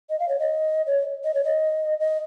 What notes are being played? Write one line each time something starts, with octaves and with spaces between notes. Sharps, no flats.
D#5
F5
C#5
D#5
C#5
D#5
C#5
D#5
D#5